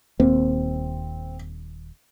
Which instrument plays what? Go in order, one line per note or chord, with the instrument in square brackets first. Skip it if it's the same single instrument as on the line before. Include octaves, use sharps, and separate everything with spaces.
[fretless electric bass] D#1 D#2 A#3 [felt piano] C4